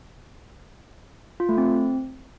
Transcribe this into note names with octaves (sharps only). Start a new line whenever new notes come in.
F4
A3
C4